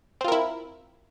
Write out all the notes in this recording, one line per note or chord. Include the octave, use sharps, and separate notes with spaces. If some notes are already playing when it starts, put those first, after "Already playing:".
C4 E4 F4 A#4